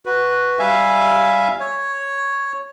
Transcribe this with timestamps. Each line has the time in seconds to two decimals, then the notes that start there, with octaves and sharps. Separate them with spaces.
0.06 F#4 B4
0.59 G3 E5 F5 G#5
1.60 C#5